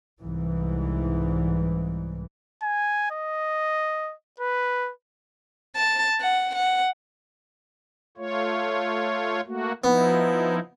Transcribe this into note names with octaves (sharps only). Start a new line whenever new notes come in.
C2 G#2 E3
G#5
D#5
B4
A5
F#5
F#5
A3 F4 C#5
A3 A#3 F#4
F3 B3 D#4 E4